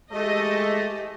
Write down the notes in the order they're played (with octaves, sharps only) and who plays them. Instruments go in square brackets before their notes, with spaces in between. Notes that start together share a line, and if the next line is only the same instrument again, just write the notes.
[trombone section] E3 A3 [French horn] G#3 [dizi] G4 [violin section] D#5